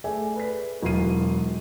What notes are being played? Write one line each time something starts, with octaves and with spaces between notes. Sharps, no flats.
A3 G#4 D5 E5 G#5
B4 B6
E1 E3 F#3 F4 C7 D#7